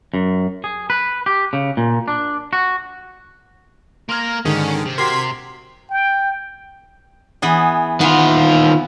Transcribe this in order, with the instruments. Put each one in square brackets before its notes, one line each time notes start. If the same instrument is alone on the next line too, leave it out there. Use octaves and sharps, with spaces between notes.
[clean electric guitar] F#2
G#4
B4
G4
C#3
A#2
D4
F#4
[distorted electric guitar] A#3 A#4 [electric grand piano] C6 F6 G#6
[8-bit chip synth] G#2 D3 D#3 [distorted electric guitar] C#4 [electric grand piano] G#4
[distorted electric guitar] C3
[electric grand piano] F#4 G4 A#4 [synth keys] C6 [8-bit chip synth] G#6 B6
[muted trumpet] G5
[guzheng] E3 B3 G#4
[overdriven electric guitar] D#3 F4 [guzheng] B3